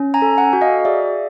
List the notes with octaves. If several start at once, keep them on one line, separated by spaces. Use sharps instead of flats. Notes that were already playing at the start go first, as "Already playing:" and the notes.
Already playing: C#4
G#5 A#5
A4
F#5 G#5
F#4
D#5 F5
G#4 D5 E5